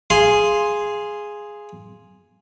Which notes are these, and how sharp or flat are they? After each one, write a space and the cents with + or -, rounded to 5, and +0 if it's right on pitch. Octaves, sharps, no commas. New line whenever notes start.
G#4 +0 F5 -15 C6 +0